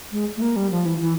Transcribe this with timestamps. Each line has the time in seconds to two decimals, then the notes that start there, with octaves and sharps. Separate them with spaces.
0.12 G#3
0.37 A3
0.42 A#3
0.56 G3
0.71 F3
0.86 E3
1.01 E3